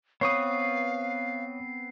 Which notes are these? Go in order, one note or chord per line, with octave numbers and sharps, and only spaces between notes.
B3 C4 B4 C#5 F5 C#6 D#6 C7